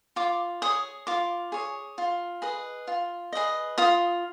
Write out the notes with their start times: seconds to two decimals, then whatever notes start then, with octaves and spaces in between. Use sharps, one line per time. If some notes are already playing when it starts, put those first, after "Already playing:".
0.16 F4 D6
0.62 G#4 C#5 D#6
1.07 F4 D6
1.52 G#4 C#5
1.98 F4
2.42 G#4 B4 D#5
2.87 F4
3.33 G#4 B4 D#5
3.78 F4 D#6